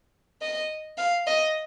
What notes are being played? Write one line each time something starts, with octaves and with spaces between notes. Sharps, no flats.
D#5
F5
D#5